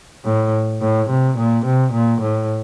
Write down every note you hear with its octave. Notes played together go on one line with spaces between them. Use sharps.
A2
A2
C3
A#2
C3
A#2
A2